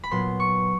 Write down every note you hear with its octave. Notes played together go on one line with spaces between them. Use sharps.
B5
A#2 F#3 B3 C6
C#6